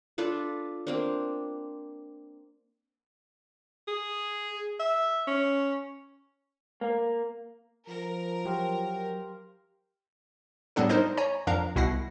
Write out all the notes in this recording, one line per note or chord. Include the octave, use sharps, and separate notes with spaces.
D4 F4 A4 B4
A#3 C4 D4
G#4
E5
C#4
A#3
F3 A#4
F#3 G4 C5 F5
A2 G3 B3 D4 A4
D#4 A#4 C5 D#5
C#5 G#5 A#5
F2 F3 D4 A#4 F5 A#5
C2 B2 E4 F#5 A#6 C7